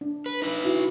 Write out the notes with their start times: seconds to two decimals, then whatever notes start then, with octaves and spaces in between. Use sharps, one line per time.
0.01 D4
0.26 B4
0.42 D#4 B4
0.64 E4 F#4